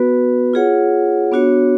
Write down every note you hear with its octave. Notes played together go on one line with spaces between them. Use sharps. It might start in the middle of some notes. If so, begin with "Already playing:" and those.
Already playing: B3 F#4 B4
F4 G#4 C#5 F#5
B3 D4 F#4 C#5